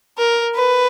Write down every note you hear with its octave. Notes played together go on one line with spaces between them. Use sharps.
A#4
B4